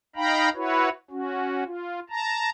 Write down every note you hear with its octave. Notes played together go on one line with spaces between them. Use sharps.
D#4 F5 G5 A#5 B5
E4 F#4 B4 C#5
C#4 F#4
F4
A5 A#5